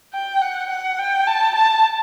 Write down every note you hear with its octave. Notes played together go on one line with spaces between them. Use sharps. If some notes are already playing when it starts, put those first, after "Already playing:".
G5
F#5
F#5
G5
A5
A5